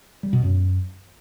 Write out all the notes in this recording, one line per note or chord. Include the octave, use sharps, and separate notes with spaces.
G3
B2
F#2